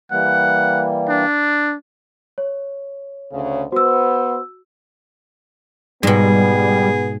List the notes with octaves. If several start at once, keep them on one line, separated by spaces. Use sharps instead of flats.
E3 G3 A#3 F#5
D4
C#5
D2 C#3
B3 F#4 C5 E6
G#2 B2 G3 B3 G#4